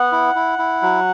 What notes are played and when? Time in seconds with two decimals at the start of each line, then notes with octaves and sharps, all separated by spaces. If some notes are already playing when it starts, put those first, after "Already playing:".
Already playing: B3 F#5
0.12 E4
0.35 E4
0.59 E4
0.82 F#3